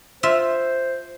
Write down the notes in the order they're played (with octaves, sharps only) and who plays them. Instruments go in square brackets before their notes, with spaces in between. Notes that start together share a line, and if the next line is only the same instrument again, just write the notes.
[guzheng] F4 E5 [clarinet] C5